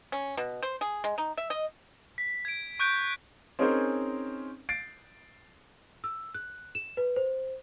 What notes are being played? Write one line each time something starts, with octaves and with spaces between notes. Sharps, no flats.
C#4
B2
C5
G#4
G#3
D#4
E5
D#5
B6
G#6 D7
C#6 F#6 G6 D7
C4 C#4 D#4 G#4 A#4 C5
A6 C7 D7
E6
F#6
E7
B4
C5